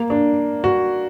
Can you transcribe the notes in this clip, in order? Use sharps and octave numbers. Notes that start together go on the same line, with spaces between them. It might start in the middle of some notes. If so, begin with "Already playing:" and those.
Already playing: A#3
D4
F#4